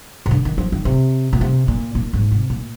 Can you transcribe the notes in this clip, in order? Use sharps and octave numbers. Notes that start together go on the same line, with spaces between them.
C3
D3
D#3
F3
D#3
C3
A#2
C3
A#2
A#2
G#2
C3
A#2